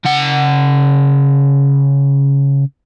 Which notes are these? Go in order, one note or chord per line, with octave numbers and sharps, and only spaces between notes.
C#3 F#5